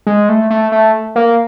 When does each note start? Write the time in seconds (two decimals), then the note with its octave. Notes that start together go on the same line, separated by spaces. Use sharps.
0.07 G#3
0.29 A3
0.50 A3
0.72 A3
1.16 A#3